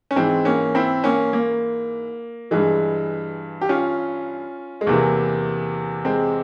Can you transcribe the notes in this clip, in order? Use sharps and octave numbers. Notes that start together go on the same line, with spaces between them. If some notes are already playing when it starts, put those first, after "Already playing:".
C#4
G#2 E3 G#3 C4
A#3 C#4
C4 E4
A#3 C#4
A#3
G2 E3 G#3
G4
C#4 F4
G#3
E2 C3 E3 A#3
G#3 C4